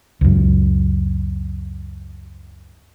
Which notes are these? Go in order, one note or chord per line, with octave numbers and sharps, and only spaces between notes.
C#2 F#2